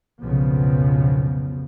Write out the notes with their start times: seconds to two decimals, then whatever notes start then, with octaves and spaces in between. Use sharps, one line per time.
0.22 B1 F2 C#3 F3 B3